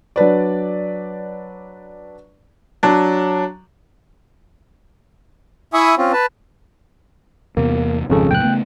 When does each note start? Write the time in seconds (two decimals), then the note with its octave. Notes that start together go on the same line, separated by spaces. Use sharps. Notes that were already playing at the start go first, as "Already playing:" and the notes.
0.16 F#3 D4 B4 D5
2.83 F#3 D4
5.73 E4 E5 G#5 B5 C#6 D#6
5.98 C4 C#4 F4
6.13 B4 A5
7.57 E2 C3 A#3 B3
8.10 G#1 F2 G#2 C#3 A4
8.31 D2 A#2 F#3 G5 F#6
8.44 C#3 A3 B3